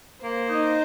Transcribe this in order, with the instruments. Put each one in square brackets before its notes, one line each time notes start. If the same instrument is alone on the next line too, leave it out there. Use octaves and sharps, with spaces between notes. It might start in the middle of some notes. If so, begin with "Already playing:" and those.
[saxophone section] A#3 [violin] C5
[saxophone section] D#4